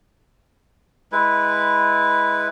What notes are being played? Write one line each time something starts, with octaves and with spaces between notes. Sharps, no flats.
G#3 E4 B4